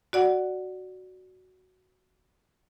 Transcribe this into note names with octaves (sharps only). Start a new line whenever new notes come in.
F#4 D5 F#5